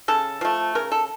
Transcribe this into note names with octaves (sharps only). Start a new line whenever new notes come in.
C#3 A4
F3 A3
C#3 A#4
A4